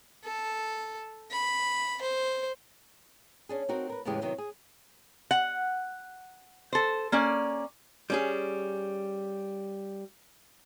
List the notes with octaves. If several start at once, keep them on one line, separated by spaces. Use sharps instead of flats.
A4
B5
C5
C#4 D4 G#4
C4 D#4 F#4 A#4
A#4 B4
E2 A2 C#3 E3 G#3 G4
C3 D#3 F#3 B3
G#4
F#5
A4 C5
A#3 C#4 D5
G3 C#4 G#4